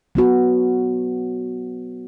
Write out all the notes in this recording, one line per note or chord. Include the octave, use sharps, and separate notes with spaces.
F#3 B3 F#4